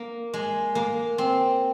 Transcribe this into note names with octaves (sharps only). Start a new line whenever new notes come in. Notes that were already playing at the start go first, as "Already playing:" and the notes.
Already playing: A#3
G#3
A#3
C4